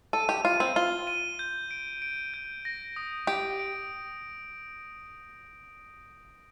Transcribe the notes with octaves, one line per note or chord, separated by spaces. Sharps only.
A4 D#7
G4
F4 D#7
C4
F4 G7
D#7
G6
D7
D7
G6
A#6
D#6
G4 D7
D7